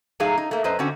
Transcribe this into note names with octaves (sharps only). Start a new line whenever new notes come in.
A2 F#3 D#4 G#4 F5
D#4
A3 A#3
F#2 B4 C5 D#5
D3 C4 C#4 F#4